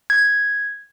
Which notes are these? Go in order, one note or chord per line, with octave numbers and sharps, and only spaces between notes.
G#6